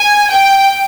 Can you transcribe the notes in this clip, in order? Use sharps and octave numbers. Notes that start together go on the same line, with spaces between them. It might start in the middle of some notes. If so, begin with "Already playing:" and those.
Already playing: G#5
G5